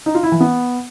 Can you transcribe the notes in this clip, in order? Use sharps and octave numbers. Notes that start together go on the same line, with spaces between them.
D#4
F4
E4
E3
B3